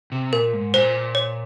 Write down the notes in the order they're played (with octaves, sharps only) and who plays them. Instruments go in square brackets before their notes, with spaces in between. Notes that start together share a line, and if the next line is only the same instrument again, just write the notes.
[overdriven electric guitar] C3
[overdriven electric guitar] A#2 [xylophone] A#4
[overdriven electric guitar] G#2
[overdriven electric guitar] A#2 [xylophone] C5
[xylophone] C#5